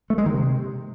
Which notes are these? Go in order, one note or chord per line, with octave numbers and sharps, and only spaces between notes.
A3
G#3
D#3
C3